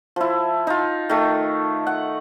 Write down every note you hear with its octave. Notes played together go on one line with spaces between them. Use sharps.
F3 E4
D#4 F4
D#3 A3
F#5